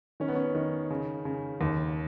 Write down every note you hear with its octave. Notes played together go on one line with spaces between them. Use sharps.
D#3 C#4
B3
C#4
D#3
C#3
C#3
D#2